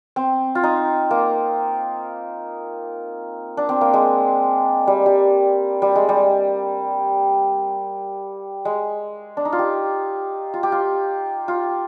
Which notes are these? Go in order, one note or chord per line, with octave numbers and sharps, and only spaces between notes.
C4
F4
D#4
A#3
D4
C4
A#3
G#3
G3
G3
G3
G#3
G3
G#3
D4
D#4
F4
G4
F4
G4
F4
F4